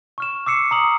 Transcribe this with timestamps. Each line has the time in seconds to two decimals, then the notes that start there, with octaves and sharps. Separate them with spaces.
0.18 C#6 F6 E7
0.46 D6 E6 C7 C#7 E7
0.71 A#5 D#6 F#7